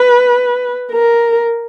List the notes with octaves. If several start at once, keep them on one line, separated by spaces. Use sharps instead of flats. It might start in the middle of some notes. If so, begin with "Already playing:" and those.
Already playing: B4
A#4